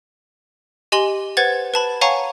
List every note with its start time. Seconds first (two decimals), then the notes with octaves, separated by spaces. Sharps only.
0.92 G4 D#5 G#5 C6 F#7 G7
1.37 B4 C5 F#5 G#6 A6
1.74 B4 A5 B5
2.01 C#5 F5 F#5 G#5 A#5 C#6